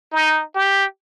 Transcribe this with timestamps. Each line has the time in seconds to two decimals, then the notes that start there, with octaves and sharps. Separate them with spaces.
0.12 D#4
0.55 G4